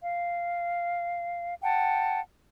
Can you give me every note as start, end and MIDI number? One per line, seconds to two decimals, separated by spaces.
0.01 1.54 77
1.61 2.20 78
1.61 2.20 79
1.61 2.20 81